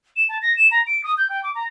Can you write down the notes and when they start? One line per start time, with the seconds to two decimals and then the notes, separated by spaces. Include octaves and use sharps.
0.16 E7
0.29 A5
0.42 A#6
0.56 E7
0.71 A#5
0.87 D7
1.04 D#6
1.18 G6
1.30 G5
1.43 D6
1.55 A#5